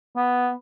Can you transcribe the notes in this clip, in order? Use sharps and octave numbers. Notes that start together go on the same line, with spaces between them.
B3